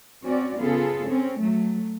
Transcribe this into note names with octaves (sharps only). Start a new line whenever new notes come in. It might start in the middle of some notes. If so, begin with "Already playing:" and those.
C4 C#4 F#4 D5
C#3 B3 F4 G#4 A4
C4 C#4
F#3 A3